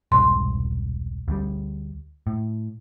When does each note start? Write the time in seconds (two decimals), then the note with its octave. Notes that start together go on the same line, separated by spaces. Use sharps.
0.12 E1 C2 G#2 C6
1.28 D2 G3
2.27 A2